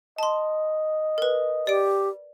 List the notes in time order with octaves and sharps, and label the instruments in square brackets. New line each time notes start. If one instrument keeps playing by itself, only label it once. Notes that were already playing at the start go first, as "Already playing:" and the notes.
[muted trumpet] D#5 [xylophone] A5 C6
[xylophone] A#4 B4
[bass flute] G4 [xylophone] D5 D7